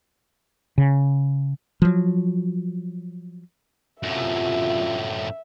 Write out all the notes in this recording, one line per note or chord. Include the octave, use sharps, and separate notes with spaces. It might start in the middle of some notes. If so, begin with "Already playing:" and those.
C#3
F3 F#3
F#2 A2 C3 F4 E5